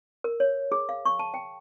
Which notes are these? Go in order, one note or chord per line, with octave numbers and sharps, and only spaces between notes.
A#4
C#5
G#4
F5
C#6
A5
G5